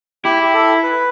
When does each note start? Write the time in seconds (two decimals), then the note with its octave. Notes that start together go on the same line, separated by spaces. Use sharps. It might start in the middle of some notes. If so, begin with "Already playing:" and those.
0.25 E4 G4
0.43 G4
0.54 A4
0.83 B4